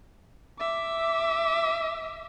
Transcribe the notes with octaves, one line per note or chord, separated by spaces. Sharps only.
E5 D6